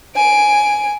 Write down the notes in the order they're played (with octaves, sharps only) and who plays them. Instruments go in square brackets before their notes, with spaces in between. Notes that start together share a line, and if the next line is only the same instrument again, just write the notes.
[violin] G#5 D7